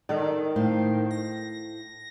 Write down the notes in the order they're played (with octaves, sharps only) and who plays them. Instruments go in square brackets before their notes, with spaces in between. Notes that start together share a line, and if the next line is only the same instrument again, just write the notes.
[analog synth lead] D#3 [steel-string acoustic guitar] D#4 A4 D5
[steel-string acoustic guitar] A2 C5 F5
[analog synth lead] A#6